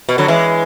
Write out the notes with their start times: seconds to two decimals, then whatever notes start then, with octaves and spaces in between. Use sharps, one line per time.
0.09 B2
0.18 D3 F#3
0.28 E3 G#3